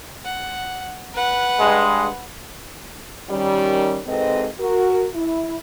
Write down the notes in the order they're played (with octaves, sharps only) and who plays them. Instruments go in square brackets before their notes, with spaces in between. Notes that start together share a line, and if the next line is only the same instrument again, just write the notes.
[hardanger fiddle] F#5
B4 F#5
[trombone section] G2 G#3
[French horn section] D#3 G3 C#4
G#2 C3 C4 A4 B4 D#5
F#4 A#4
E4